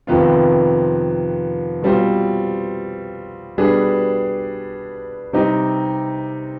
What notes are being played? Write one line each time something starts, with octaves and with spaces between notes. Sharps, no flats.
F2 C3 D#3 B3 F4
B2 G3 C4 F4 C5
B2 G3 D4 G#4 B4
C3 G3 C4 D#4 G4